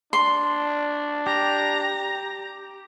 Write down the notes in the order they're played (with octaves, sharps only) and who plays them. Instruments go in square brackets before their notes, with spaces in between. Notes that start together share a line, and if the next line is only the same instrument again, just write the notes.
[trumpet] D4 [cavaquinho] C6
[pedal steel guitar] G4 [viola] A#5